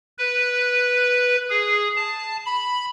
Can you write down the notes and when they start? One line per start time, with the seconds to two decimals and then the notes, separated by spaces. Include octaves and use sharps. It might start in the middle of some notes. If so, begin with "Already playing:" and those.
0.18 B4
1.50 G#4
1.96 A5
2.46 B5